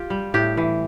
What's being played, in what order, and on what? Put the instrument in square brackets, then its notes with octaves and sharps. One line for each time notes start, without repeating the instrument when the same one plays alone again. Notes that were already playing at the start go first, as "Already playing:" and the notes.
Already playing: [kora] F4 G4
G3
A2 G4
E3